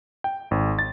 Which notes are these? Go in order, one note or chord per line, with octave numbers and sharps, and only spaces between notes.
G5
G#1
A6